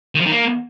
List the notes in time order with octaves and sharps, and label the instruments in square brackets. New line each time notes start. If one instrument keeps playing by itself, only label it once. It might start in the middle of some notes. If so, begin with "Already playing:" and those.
[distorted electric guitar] D#3
F3
D#3
A#3